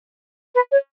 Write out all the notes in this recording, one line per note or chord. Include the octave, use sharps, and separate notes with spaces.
B4
C#5